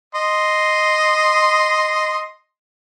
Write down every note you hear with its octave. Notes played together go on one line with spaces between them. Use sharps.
D#5 C6